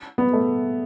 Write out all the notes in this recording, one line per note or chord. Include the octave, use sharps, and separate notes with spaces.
B3
A3